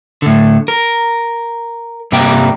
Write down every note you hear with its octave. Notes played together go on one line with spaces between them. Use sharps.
A2 D3
A#4
G2 C3 G3 A#3 G5 A#5